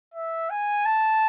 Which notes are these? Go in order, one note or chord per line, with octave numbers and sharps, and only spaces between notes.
E5
G#5
A5